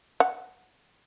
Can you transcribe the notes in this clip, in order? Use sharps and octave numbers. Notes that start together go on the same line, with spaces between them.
F#5